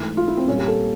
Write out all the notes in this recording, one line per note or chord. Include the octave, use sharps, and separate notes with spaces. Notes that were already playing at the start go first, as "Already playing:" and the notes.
Already playing: G#2 E3 A3
F4
E4
C4
A#2 G3 A#3 C#4
G4
A4